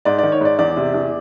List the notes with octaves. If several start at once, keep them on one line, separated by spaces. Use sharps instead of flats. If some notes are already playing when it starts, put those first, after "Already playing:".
G#2 D5
D#3 D5
C#5
G#2 D5
E2 D5
C3
E2